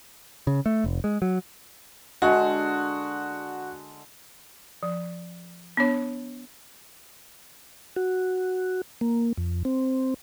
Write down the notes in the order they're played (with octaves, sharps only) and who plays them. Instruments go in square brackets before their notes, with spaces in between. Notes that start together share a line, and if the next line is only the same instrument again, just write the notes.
[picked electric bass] C#3
A3
F1
G#3
F#3
[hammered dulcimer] D3 G#3 [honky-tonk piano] F#4
[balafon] F3
B3 D4 C#5
[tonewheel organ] F#4
A#3
F2
C4